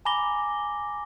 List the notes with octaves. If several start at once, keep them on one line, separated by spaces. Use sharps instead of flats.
G#5 A#5 B5 D6 A#6 G7